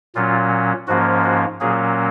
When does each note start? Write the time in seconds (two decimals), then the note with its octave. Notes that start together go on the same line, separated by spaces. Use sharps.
0.15 A#2 F#3 C#4 F4
0.87 G#2 F3 A#3 C#4 F#4
1.24 F#4
1.60 A#2 F#3 A#3 C#4 G#4